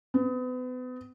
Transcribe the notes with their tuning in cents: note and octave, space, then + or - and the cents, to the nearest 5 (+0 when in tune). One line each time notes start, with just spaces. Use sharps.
B3 +35